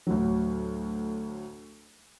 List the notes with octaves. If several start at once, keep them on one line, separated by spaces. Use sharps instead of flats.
D2 A2 F#3